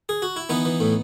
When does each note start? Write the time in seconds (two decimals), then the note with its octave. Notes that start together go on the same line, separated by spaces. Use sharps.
0.09 G#4
0.22 F#4
0.36 E4
0.49 E3 B3 D#4
0.65 E3
0.80 A2